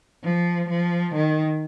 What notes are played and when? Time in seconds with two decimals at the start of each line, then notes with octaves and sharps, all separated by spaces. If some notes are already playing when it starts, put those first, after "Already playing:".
0.24 F3
0.69 F3
1.15 D#3